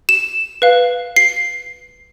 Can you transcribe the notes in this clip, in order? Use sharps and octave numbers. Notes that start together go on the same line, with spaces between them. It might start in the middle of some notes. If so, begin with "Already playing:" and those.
E7
B4 F5
C7